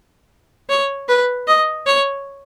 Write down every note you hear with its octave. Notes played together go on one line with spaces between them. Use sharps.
C#5
B4
D#5
C#5